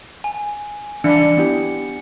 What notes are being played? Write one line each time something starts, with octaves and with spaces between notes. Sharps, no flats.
G#5
E3 D4 B5 C#7
B3 E4 G4